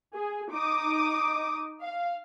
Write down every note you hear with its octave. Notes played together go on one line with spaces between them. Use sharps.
G#4
D#4 D6 D#6
F5